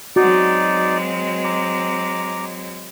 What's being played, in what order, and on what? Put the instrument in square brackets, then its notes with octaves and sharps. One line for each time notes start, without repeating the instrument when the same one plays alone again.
[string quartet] F#3 G#3 C4 [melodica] D#4 D5 [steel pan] F#4
[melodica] A#5 D6